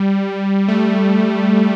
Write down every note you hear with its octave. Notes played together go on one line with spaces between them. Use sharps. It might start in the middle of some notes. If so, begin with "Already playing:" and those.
Already playing: G3
A3